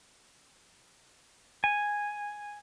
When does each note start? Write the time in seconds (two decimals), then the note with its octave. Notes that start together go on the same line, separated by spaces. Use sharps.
1.64 G#5